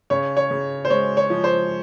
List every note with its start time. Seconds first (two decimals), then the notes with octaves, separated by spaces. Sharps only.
0.10 C#3 C#5
0.37 C#5
0.51 C#3
0.85 C5
0.90 G#3 C#5
1.17 C#5
1.30 F3
1.44 C5